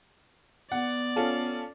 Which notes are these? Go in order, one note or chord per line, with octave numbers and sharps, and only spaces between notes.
B3 D5 F#5
C#4 F4 A4